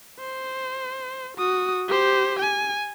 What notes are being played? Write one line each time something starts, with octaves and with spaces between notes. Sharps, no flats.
C5
F#4 D#6
G4 C5
G#5